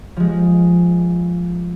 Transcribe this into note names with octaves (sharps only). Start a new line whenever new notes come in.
F3 G#3